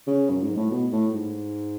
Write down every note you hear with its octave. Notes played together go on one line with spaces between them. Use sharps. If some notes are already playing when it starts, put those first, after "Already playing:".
C#3
F#2
G#2
A2
B2
A2
G#2